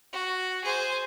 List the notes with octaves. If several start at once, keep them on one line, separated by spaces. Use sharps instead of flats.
F#4
G#4 C5